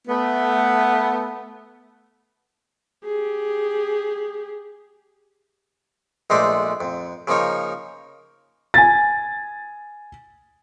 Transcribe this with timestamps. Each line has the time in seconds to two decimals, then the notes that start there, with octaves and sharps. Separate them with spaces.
0.07 A3 B3
3.04 G4 G#4
6.30 A#1 G#3 A3 D#4 C5 D5
6.81 F2
7.27 C#3 F3 A#3 D#4 C#5
8.74 G#5 A6